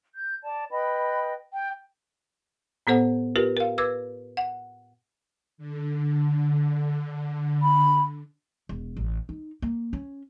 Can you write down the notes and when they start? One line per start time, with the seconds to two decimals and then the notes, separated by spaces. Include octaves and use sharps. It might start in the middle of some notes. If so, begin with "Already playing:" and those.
0.13 G6
0.43 D5 A5
0.71 B4 D#5 G5 B5
1.53 G5
2.87 A2 B3 A4 C5 F#5
3.36 F4 G4 A#4 B4
3.57 A#4 F5
3.78 B4 D6 E6 G#6
4.37 F#5
5.58 D3
7.62 B5
8.69 E1
8.97 A1
9.29 D#4
9.62 A#3
9.93 C#4